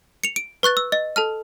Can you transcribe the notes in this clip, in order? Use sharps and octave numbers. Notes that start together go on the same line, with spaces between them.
C#7 F7
D7
B4 C#6 F#6 A6
E6
D#5
A4 A5 F6